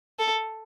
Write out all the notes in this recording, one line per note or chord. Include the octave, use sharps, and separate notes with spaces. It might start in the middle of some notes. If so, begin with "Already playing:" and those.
A4